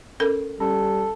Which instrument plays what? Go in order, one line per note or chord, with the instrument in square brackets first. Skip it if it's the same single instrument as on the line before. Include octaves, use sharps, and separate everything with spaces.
[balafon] C#4 A4 A#4
[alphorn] G3 [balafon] C#4 [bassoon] A4